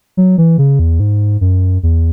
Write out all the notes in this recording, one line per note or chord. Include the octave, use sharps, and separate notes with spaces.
F#3
E3
C#3
E2
G#2
F#2
E2